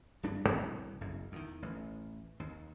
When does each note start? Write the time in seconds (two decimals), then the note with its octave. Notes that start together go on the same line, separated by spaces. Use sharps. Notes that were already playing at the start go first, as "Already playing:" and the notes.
0.23 D1 G2 D4
0.47 C2 F2 B2 E3
1.01 F#1 B1 F#2
1.32 E2 D#3
1.62 A1
2.40 D#2